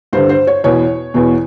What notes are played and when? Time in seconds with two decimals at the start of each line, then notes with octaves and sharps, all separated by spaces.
0.13 G2 D3 C5
0.29 C5
0.47 C#5
0.64 E2 B2 C#5
1.14 E2 B2